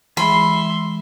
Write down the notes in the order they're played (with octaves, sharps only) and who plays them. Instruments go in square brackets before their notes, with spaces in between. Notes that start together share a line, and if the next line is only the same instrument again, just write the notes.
[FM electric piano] E3 G#3 [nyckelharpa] E5 C6 [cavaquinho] B5